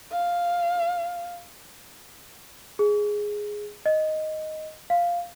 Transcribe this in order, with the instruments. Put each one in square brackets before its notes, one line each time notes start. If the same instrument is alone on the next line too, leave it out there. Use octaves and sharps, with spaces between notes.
[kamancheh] F5
[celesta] G#4
D#5
F5